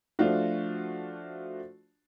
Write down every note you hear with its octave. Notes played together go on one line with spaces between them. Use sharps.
F3 A3 D4 F4 F#4